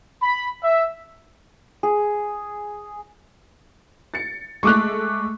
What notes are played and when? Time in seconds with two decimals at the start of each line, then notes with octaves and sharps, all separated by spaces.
0.23 B5
0.63 E5
1.83 G#4
4.14 A6 C#7
4.63 G#3 A3 C#6 D6 F#6